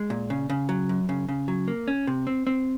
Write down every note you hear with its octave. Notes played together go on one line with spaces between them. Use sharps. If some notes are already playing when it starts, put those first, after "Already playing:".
Already playing: G#3
A#2
C#3
C#3
F#3
F#2
C#3
C#3
F#3
A#3
C#4
C3
C4
C4